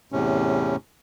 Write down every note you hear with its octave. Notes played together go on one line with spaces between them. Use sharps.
E2 A2 C3 C#4